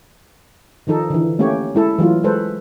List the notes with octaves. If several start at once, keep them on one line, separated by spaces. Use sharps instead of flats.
D#3 F3 D#4 A4
D3 E3
A3 A#3 C#4 G4 C#5
G#3 E4 A4
E3 F#3 A3 F4
G#3 A4 B4 C5